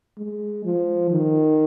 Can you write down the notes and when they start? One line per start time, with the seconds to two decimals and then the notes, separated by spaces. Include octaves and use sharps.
0.18 G#3
0.64 F3
1.11 D#3